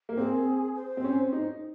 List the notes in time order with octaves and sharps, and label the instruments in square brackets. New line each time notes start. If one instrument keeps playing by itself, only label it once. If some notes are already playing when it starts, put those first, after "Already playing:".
[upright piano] A#3
[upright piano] C4 [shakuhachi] G#4
[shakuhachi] C5
[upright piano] C4
C#4
D#4